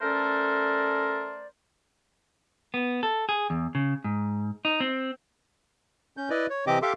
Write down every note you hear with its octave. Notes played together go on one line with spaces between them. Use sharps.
A3 C#4 A4 A#4 C5 D5
B3
A4
G#4
E2
C#3
G#2
D#4
C4
C#4 G6
E4 B4 D5 D#5
C#5
C3 E3 C4 G4 D#5 D6
G4 A4 E5 F5 C6 D6